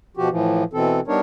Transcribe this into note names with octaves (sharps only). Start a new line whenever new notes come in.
B2 F3 F#4 G4
A2 E3 F3
B2 E3 C4 A4
G3 B3 D4 D#4 A#4 C#5